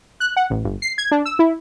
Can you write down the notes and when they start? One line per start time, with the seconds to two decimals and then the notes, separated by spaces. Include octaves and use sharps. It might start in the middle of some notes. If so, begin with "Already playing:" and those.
0.20 F#6
0.37 F#5
0.50 A1
0.64 G1
0.82 C7
0.98 G#6
1.11 D4
1.26 E6
1.39 E4